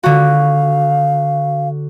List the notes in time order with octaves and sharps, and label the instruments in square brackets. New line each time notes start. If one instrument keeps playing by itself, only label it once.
[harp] D3 F#4 [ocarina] F5